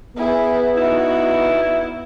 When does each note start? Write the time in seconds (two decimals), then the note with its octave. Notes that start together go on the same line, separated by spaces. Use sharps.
0.17 B3 E4 G#4
0.77 D#4 E4 F#4